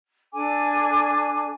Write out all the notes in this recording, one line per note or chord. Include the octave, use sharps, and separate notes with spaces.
D4 A4 G#5 D6